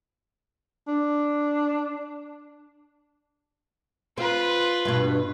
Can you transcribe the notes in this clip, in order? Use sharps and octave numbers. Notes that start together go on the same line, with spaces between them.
D4
C4 F4 B4
G2 B2